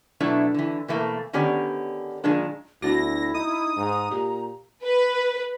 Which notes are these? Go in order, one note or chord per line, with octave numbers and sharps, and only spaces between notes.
B2 F#3 A3 D4 E4
D3 E3
B2 E3 A3 A#3
D3 D#3 B3 C#4 G4 D5
F#2 A#2 D#3 G#3 D4
D2 B3 D4 E4 F#4 A#6
D#4 D#6
G#2 A#5
A#2 G4
B4